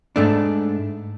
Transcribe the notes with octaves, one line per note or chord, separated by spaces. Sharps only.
G#2 A3 D4